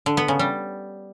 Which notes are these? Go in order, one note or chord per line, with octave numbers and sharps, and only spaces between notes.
D3
B3
C#3
G3